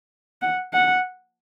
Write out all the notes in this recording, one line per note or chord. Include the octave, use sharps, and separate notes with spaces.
F#5
F#5